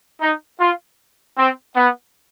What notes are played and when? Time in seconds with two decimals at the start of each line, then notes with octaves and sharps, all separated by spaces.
0.21 D#4
0.60 F4
1.37 C4
1.76 B3